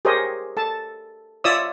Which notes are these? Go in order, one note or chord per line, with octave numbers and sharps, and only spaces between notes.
G4 G#4 A#4 C5 C#5 D#5
A4 A5
F4 C#5 D5 E5 D#6 E6